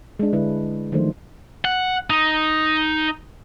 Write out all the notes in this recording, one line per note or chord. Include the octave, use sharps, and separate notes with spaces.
G#3 D4
D3 G#3 E4 B4
D#3 F3 F#3 A3 D4 C5
F#5
D#4